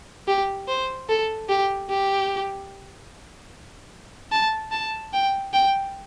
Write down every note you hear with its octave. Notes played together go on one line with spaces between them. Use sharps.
G4
C5
A4
G4
G4
A5
A5
G5
G5